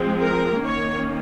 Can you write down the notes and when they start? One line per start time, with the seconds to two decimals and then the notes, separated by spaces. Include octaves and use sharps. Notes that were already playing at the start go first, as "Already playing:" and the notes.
Already playing: F3 G#3 C4
0.20 A#4
0.62 D#3 A#3 C#4 C#5